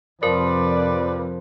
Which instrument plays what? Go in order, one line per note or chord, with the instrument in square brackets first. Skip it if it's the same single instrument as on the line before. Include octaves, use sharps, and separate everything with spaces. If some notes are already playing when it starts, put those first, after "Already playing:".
[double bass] F2 C3 [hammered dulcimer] F3 [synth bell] A#4 [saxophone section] B4 D5